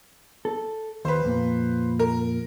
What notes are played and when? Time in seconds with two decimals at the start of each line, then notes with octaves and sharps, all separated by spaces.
0.45 A4
1.05 D#2 B4 C5
1.25 F2 A#2
1.99 A#4